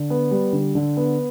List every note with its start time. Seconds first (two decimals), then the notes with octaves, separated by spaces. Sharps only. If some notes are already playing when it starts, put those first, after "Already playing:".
Already playing: D3
0.10 B3
0.31 G3
0.53 D3
0.75 D3
0.97 B3